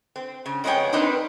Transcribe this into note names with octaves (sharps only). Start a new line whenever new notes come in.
C4
C#3
F2 G#3 B3 G#4 C#5 G5
C4 D4 D#4 A#4 B4